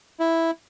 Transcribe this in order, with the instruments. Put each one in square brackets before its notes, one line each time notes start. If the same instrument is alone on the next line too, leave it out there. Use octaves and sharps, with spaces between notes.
[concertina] E4